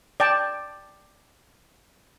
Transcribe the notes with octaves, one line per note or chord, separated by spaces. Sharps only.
D5 G5 A5